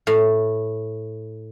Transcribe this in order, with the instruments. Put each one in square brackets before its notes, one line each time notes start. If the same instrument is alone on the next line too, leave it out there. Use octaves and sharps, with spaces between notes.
[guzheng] A2